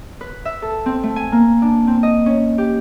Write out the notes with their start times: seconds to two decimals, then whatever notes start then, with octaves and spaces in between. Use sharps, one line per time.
0.21 B4
0.45 E5
0.62 A4
0.86 C4
1.03 A3
1.16 G#5
1.32 A#3
1.62 D4
1.87 C4
2.03 D#5
2.26 C#4
2.58 G4